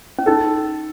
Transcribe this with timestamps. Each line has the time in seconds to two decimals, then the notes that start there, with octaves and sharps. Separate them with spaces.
0.19 C#4
0.26 D#4 A4